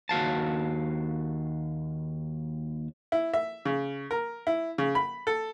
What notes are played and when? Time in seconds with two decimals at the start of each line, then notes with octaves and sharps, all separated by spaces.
0.09 D#2 F#4 F5 A5
3.12 E4
3.34 E5
3.65 C#3
4.11 A#4
4.47 E4
4.78 C#3
4.95 B5
5.27 A4